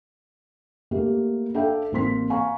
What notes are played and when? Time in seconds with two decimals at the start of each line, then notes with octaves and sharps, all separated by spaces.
0.91 A3 A#3 G4
1.54 D4 A4 E5 F5 G5
1.92 A1 A#3 C4 C6 B6
2.30 F5 G#5 A#5 C#6